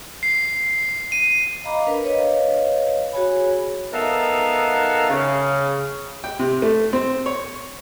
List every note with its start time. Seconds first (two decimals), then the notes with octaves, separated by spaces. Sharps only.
0.23 C7
1.12 D#7
1.64 D#5 F5 A#5 B5 D6
1.87 D4 A#4 B4
2.03 B4 C#5 D#5 F5
3.13 F#4 G#4 C#5 G#5 B5
3.93 B3 D#4 A4 A#4 E5 F5
5.09 C#3
6.24 G5
6.39 C3
6.62 A3
6.93 C4
7.26 C#5